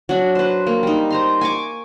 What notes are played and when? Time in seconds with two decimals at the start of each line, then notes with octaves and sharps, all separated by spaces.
0.09 F#3 D4
0.35 B4 C5
0.67 A#3
0.83 G3 D#4
1.10 C5 A#5 C6
1.41 G#5 C#6 D6